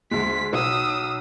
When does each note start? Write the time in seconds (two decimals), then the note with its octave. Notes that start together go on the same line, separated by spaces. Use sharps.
0.11 D2 G#3 B6
0.53 B1 D#6 E6